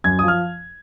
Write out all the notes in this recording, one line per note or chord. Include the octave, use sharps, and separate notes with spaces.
F#2 G#6
F3 D#6
F6